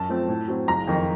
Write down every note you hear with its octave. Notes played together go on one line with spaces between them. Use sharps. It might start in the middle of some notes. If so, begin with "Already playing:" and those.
Already playing: F#2 A5
F3 A3 C4
A2
F#3 C4
F#1 A#5
F2 D#3